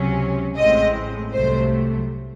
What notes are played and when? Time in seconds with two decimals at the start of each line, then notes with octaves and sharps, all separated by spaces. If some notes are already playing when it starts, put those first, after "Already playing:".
Already playing: C#2 C3 F#3 C#4
0.57 A1 A2 G#3 C4 D#5
1.33 C2 C3 F#3 A3 C5